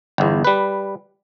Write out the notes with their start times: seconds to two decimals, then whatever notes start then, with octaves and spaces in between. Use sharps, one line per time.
0.18 G1 E2
0.44 G3 B4